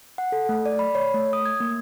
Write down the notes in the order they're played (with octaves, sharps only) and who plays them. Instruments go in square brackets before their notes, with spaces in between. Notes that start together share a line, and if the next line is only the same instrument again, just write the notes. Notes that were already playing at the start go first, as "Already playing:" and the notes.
[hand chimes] F#5
A4
A3
D5
B5
C#5
A3
D#6
G#6
A#3